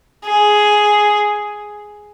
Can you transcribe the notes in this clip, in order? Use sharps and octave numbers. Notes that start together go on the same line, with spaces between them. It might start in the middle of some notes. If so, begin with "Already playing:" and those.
G#4